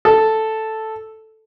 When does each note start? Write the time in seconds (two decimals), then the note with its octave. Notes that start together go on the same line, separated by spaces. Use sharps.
0.05 A4